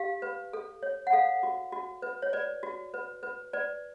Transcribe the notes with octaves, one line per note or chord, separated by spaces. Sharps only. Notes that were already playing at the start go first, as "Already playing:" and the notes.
Already playing: G4 F5
B4
A4
C#5
F#5
A4 F5
F#4
F#4
B4
C#5
B4 D5
F#4
B4
B4
B4 D5